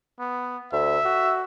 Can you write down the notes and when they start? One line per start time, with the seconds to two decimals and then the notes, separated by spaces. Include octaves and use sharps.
0.19 B3
0.72 D2 E5
1.05 F#4